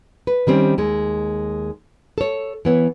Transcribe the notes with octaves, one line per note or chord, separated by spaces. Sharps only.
B4
D#3 G3 C4 C#4
D#2 G#3
A4 C#5
E3 B3 C#5